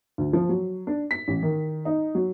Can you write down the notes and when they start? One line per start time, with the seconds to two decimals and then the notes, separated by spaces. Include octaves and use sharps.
0.18 D2
0.33 F3
0.49 F#3
0.87 D4
1.11 B6
1.28 A1
1.43 D#3
1.85 D#4
2.15 F#3